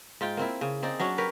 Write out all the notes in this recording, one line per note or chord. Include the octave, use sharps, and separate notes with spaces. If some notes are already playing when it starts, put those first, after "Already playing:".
G#2 F4 G5
A#3 C4 E4
C#3
C4 D#4 G#4 D5
F#3 C#4 D4 C#5
G4 A#4 B4 C#5